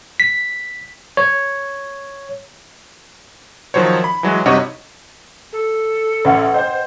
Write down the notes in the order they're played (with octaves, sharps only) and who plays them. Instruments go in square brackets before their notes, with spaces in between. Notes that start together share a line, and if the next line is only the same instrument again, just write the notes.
[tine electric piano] B6
C#5
[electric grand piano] D#3 F3 F#3 C5 C#5
B5
E3 F#3 G#3
G2 C3 D#4 F#4 C#5 D#5
[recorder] A4
[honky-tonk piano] A1 C#4 E5 [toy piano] B4 F#5
[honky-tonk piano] C5 G6 [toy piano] D#5 G5